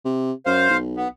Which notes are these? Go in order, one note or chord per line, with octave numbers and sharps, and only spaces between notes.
C3
F#2 C5 F5
B1
B3